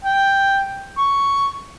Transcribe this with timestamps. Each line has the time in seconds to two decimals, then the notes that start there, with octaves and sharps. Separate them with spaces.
0.05 G5
0.98 C#6